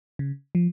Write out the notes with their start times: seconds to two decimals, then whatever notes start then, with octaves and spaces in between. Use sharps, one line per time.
0.19 C#3
0.55 F3